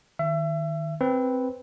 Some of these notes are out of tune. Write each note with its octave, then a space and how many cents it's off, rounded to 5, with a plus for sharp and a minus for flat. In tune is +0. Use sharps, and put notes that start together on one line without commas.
D#3 +0 E5 +30
C4 +0 B4 +0